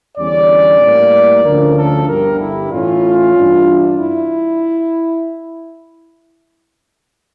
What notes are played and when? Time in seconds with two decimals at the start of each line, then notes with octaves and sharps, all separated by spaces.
0.17 E2 D3 G3 C#4 D5
0.80 A2 G3 A#3
1.44 D2 D3 F3 C#4 A#4
1.76 A4
2.07 G1 G2 D3 G3 A#4
2.39 E4
2.71 A2 E3 A3 C#4 F4
3.34 G2 E3 G3 D4
3.98 E4